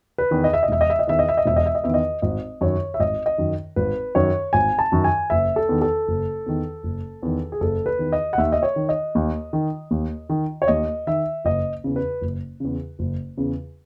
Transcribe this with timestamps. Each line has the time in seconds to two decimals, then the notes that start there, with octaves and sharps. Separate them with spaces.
0.18 B4
0.31 E2 D#3
0.44 D#5
0.53 E5
0.63 D#5
0.68 E1 E5
0.81 D#5
0.90 E5
0.99 D#5
1.07 E2 D#3 E5
1.19 D#5
1.29 E5
1.37 D#5
1.46 E1 E5
1.56 D#5
1.66 E5
1.75 D#5
1.84 E2 D#3 E5
1.94 D#5
2.22 G#1 D#5
2.61 F#2 D#3 C#5
2.94 E5
3.00 G#1 D#5
3.26 D#5
3.38 F#2 D#3
3.76 G#1 B4
4.15 F#2 D#3 C#5
4.53 G#1 G#5
4.79 A5
4.92 F#2 D#3
5.04 G#5
5.30 F#1 E5
5.56 A4
5.69 E2 D#3
5.82 A4
6.08 F#1
6.46 E2 D#3
6.83 F#1
7.23 E2 D#3
7.52 G#4
7.60 F#1 A4
7.86 B4
7.99 E2 D#3
8.12 D#5
8.33 F#5
8.38 D#2 E5
8.52 D#5
8.63 C#5
8.76 D#3
8.89 D#5
9.15 D#2
9.53 D#3
9.91 D#2
10.29 D#3
10.62 C#5
10.68 D#2 D#5
11.07 D#3 E5
11.45 F#1 D#5
11.84 E2 C#3
11.96 B4
12.21 F#1
12.60 E2 C#3
12.99 F#1
13.37 E2 C#3